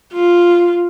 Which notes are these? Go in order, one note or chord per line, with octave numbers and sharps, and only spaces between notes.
F4